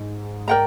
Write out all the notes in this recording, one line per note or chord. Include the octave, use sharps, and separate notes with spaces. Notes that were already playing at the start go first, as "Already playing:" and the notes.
Already playing: G#2
A#4 D5 G5 A#5